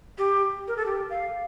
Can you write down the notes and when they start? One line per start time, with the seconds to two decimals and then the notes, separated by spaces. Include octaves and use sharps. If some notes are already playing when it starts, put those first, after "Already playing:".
0.18 G4
0.68 A#4
0.77 A4
0.86 G4
1.10 F5